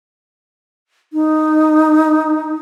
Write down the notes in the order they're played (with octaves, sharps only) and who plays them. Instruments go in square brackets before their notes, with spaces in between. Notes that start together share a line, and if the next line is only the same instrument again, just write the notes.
[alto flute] D#4